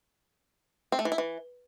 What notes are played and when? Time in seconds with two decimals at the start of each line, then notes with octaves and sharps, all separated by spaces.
0.92 C4
0.99 A3
1.05 E3
1.12 E4
1.18 E3